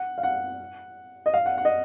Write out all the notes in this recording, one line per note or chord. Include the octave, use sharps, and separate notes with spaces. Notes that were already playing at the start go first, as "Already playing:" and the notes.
Already playing: F#5
F5
F#5
D#5
F5
F#5
F#5
D#5